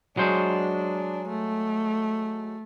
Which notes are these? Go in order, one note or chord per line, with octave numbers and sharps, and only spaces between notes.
F#3 G#3 D4 C5
A3